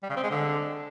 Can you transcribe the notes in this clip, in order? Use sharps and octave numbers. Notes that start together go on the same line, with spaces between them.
G3
C#3
C4
G#3
D3